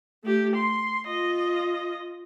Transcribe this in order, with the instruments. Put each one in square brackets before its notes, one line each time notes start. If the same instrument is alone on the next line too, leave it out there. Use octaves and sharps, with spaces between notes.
[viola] A3 G4
C6
F4 D#5